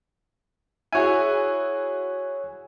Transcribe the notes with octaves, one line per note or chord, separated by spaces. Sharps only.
E4 F#4 G#4 C#5 G#5